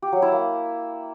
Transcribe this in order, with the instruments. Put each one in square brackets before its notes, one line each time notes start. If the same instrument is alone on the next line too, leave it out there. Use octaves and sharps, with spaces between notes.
[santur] G4
F#3
E4
A#3